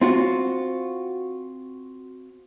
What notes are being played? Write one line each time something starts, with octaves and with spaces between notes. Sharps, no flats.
C4 F4 F#4